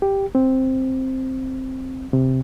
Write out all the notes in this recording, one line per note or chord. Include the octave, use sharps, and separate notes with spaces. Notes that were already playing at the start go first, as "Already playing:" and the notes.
G4
C4
C3